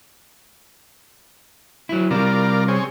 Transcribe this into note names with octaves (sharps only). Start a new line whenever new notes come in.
F#3 E4
C3 G3 F4 A#4 D5
C4 G#4 C#5